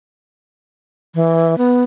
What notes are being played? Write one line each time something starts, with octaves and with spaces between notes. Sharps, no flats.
E3
B3